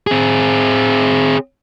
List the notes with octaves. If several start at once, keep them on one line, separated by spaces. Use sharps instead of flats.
C4 G#4